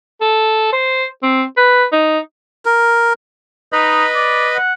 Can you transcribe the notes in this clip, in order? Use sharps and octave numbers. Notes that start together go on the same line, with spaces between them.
A4
C5
C4
B4
D#4
A#4
D#4 B4 D#5 B5
D5
F#5